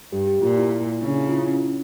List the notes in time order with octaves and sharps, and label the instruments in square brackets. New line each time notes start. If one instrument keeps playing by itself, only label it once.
[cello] G2 [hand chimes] G4
[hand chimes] G4
[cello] A#2 [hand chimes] F4
[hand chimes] E4
[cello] C#3 [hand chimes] D4
[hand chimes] E4
F4
E4
C#4
D4